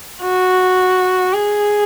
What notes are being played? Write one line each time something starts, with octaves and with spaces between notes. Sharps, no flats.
F#4
G#4